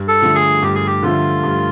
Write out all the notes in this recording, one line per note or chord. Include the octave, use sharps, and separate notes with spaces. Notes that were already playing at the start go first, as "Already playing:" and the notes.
Already playing: G2
A4
D3 F3 A3
G#4
G2 G4
G#4
G4
D3 F3 A3 F4
G2